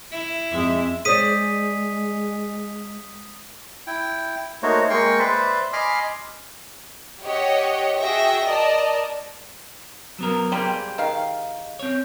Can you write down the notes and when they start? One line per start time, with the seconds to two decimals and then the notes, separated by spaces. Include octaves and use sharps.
0.12 E4
0.51 F2 G#3 C4 E5
1.05 G#3 G#4 C5 D5 D#6 B6 D#7
3.87 E4 G5
4.63 A3 A#3 D#4 F#4 C5 C#5
4.90 G#3 A#3 G5 C6 C#6
5.19 B4 C5 D5 E5
5.73 D#5 G#5 B5 C6 D6 F6
7.22 G4 C#5 D#5 F#5
7.98 F#4 G#4 E5 G5 A#6
8.44 A#4 D5 D#5 A5
10.19 F#3 B3 A#4
10.52 G3 A#3 G4 G#4 C5
10.98 D#3 F5
11.79 C4 C#5